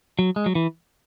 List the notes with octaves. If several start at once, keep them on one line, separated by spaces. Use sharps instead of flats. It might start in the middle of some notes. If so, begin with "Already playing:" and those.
F#3
G#3
F#3
E3